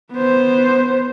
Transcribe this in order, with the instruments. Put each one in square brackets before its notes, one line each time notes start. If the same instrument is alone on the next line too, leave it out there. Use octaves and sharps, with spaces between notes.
[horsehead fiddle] B3 C5